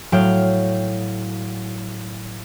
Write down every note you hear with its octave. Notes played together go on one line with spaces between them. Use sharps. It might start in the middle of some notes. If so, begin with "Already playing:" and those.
A2 F#3 F5 G5